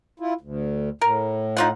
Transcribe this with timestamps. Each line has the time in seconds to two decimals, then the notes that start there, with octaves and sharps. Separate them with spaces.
0.20 E4 F4
0.41 D2
1.01 A2 A#4
1.57 D#4 F4 F#5